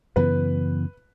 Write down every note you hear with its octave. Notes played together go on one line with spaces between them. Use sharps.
F#2 C#3 E3 B3 B4